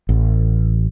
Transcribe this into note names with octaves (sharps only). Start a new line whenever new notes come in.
A1